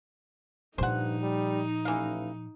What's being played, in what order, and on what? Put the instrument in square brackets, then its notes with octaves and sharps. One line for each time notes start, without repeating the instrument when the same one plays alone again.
[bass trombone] G2 [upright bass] A#2 F3 [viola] D#4 [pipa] C5 F#5
[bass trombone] G3
[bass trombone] A1 [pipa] E3 F5